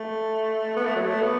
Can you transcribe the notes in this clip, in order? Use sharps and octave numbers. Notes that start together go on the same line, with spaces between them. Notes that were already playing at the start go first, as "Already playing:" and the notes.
Already playing: A3
B3
A3
F#3
A3
B3